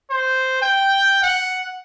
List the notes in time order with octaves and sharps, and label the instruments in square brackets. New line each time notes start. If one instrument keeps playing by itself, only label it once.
[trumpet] C5
G5
F#5